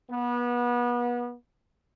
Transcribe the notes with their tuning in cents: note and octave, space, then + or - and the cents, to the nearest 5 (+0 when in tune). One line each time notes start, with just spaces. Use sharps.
B3 -30